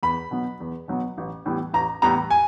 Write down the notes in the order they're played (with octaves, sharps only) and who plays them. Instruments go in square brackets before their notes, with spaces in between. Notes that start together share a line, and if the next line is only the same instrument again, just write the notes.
[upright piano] E2 B5
B2 F#3 B3
E2
B2 F#3 B3
A1
A2 E3 G3 B3
A1 A#5
A2 E3 G3 B3 A#5
G#5